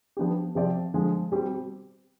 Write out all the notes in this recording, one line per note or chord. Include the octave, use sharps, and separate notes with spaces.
F3 B3 D4 G4
C3 F3 C4 G4 D5
D3 F3 G#3
B2 G3 C4 G4